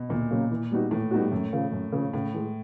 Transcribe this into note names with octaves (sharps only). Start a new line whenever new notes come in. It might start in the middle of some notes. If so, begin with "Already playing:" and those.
Already playing: B2
D2 A#2
C#3 F#3 A#3
E3
G3 B3 D#4 F#4
A2 E3
G3 B3 D#4 F#4
F#2
C#3 F3
F#2
C#3 F3
A2 C#3
E3 G#3